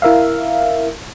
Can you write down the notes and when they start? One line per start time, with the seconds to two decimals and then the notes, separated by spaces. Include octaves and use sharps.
0.02 E4 A#4 E5 F5